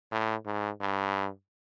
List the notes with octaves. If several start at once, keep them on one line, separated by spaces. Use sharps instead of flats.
A2
G#2
G2